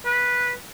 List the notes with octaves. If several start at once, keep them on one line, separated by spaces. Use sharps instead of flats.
B4